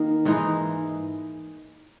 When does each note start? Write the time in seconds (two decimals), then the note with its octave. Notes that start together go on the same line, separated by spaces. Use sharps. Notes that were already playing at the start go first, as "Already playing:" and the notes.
Already playing: D#3 A#3
0.25 G#2 E3 G#3 D#4